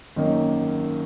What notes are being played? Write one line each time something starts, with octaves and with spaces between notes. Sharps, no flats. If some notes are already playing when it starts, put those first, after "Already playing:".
G#1 F#2 D#3 A#3 D#4